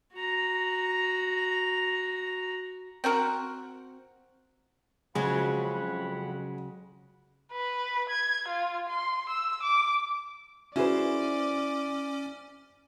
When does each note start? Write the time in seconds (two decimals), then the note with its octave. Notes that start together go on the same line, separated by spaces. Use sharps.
0.13 F#4 A#5
3.04 C4 F#4 A#4 F#5
5.15 F2 C#3 F#3 G#3 F#5 B5
7.53 B4
8.09 G#6
8.48 F4
8.89 C6
9.29 E6
9.63 D6
10.76 C#4 E4 F#4 G#4 B4 C5 D5